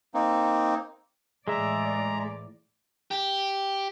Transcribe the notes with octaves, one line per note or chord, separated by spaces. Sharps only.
A#3 C4 D#4
A2 E3 G#3 G#4 D5 E5 A#5
G4